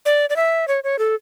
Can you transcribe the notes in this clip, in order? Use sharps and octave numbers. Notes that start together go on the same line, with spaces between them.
D5
D5
E5
C#5
C#5
A4